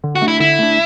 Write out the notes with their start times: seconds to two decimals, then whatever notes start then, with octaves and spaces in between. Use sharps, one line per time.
0.04 D3
0.15 F#4
0.22 A3 D4
0.28 E4
0.40 D3 E4
0.59 A3 D4